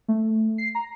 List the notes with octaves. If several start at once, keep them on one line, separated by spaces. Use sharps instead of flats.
A3
C7
A#5